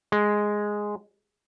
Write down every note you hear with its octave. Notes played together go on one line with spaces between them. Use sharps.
G#3